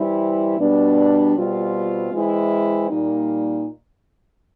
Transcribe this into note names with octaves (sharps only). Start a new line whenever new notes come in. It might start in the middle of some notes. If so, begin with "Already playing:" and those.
Already playing: E3 G3 C4 E4
B2 G3 B3 D4
B2 G3 C4 F4
E3 G#3 C4 E4
A#2 G3 A#3 D#4